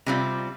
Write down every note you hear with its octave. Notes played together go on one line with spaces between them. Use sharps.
C3 G3 C4 F4